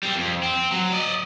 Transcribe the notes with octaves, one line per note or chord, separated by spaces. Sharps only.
G3 C4
F2
C4
F#3
D5 D#5